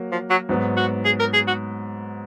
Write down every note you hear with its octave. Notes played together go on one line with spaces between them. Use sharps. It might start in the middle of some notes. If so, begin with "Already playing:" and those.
Already playing: F#3 A#3
F3
F#3
G#2 F#3 B3
F#4
G#4
A#4
G#4
F#4